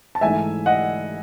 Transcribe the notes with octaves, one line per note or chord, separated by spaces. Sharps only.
A5
G#2 E3 A3 D#4 E5 G#5
D#5 F#5